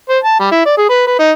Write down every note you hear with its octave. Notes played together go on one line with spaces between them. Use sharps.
C5
A5
G3
E4
D5
G#4
B4
B4
D#4